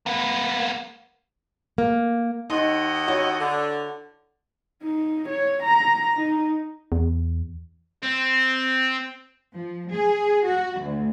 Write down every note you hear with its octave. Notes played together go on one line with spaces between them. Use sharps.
A#3 B3
A#3
D#2 D#4 D#5 F#5 C6
E4 F#4 C#5
D3
D#4
C#5
A#5
D#4
E2
C4
F3
G#4
F#4
D2